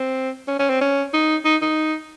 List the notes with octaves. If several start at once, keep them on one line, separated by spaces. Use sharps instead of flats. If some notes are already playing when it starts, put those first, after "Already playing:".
Already playing: C4
C#4
C#4
C4
C#4
D#4
D#4
D#4